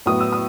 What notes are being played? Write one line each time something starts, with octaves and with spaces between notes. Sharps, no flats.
A2 F#3 B3 D#6
E6
D#6